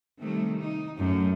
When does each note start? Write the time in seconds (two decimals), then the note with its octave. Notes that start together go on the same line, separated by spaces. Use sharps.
0.20 C3 D#3 G3 A3
0.62 D#4
0.99 F#2 A3